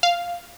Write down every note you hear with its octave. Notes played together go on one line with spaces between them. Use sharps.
F5